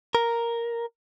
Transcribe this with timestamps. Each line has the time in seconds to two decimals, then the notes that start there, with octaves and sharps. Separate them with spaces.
0.15 A#4